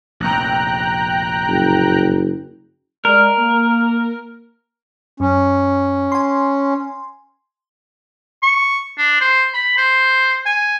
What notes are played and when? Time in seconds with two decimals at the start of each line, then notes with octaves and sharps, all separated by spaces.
0.20 F1 A#1 G5 A#5 F#6
1.47 F#1
3.05 G#3 A#4 D5
3.39 A#3
5.20 F#2 C#4
6.12 G#5 C6
8.43 C#6
8.98 D4
9.21 C5
9.54 B5
9.77 C5
10.46 G#5